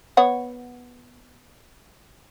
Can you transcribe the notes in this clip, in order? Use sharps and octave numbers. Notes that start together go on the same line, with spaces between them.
B3 C#5 F#5